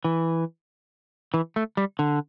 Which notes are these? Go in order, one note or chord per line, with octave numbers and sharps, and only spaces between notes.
E3
E3
A3
G3
D3